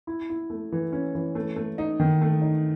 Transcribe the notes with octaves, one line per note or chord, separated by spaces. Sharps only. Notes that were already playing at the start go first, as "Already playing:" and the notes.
E4
E4
A3
E3
C#4
E3
A3
A3
D#4
D#3
A3
D#4